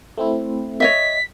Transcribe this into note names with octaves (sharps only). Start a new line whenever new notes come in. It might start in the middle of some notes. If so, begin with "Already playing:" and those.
A3 C4 E4
C#5 D#5 E5 B6